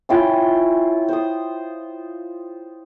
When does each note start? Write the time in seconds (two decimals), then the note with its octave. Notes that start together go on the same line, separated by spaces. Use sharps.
0.09 C#4 E4 F4 G5
1.09 C5 D#6